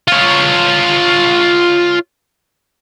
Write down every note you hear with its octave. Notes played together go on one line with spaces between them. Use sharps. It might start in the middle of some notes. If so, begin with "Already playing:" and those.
F4 C#5